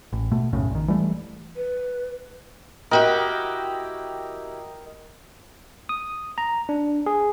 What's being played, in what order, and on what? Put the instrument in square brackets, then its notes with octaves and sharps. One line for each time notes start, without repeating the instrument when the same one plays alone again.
[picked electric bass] A1
B2 A3
B1 F#2 A2 C#3
A#1 D#3
E3 G3 A3
[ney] B4
[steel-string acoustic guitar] E4 F#4 G4 [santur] A#4 D#5 G5
[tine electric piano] D#6
A#5
D4
G#4